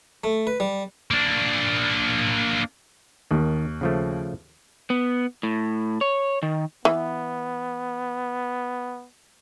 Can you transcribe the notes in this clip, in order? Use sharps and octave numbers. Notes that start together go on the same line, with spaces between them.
A3
B4
G3
A#3 D4
D#2 D#3
C#3 F3 A3
B3
A2
C#5
D#3
E3 B3